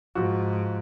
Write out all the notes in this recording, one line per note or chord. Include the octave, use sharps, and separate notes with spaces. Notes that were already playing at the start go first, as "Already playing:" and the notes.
G#2 F3 F#4